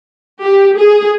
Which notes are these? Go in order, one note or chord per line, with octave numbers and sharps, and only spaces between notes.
G4
G#4